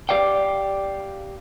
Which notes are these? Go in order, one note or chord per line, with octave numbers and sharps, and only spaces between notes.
G4 D5 F5 G5